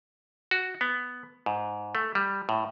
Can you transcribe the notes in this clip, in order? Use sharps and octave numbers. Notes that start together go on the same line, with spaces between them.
F#4
B3
G#2
A3
G3
A2